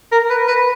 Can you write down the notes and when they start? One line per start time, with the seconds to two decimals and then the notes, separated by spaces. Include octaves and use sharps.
0.12 A#4
0.30 B4
0.48 B4